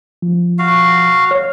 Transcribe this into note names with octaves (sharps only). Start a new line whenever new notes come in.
F3
F#4 F5
C#5 F6